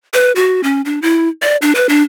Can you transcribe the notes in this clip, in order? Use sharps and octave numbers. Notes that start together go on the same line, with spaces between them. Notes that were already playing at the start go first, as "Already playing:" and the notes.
B4
F#4
C#4
D4
E4
D5
D4
B4
D4